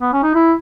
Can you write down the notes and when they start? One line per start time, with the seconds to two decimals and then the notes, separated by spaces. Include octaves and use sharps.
0.01 B3
0.13 C#4
0.23 D#4
0.35 E4